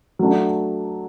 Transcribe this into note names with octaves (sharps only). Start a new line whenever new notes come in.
F#3 A3 D4